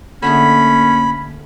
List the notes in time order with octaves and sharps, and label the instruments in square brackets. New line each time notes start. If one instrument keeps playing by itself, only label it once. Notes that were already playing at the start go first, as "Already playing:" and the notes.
[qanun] D3 A3 G#4 [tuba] A#3 [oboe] C#4 [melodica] B5